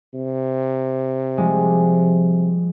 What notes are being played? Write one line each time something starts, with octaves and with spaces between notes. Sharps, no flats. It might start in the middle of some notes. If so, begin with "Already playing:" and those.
C3
F3 G3 G#3